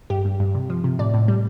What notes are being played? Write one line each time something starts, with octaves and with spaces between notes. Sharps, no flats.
G2 G4
G2
G2
C3
F3
C3
A2 D5
A2
G3